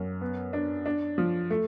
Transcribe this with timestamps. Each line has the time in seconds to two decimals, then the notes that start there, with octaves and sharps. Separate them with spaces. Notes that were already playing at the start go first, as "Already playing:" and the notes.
Already playing: F#2
0.21 B3
0.53 D4
0.86 D4
1.18 F3
1.50 A3